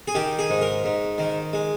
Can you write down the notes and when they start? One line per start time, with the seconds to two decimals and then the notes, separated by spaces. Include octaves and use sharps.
0.08 G#4
0.15 D#3 G4
0.39 G#4
0.50 G#2
0.61 A#4
0.84 G#2
1.18 D#3
1.53 G#3